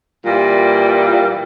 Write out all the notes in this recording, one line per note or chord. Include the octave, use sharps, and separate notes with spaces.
A#2 E3 G3